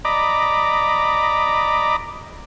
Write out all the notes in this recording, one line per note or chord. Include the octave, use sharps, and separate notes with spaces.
D5 D#5 A#5 B5 D6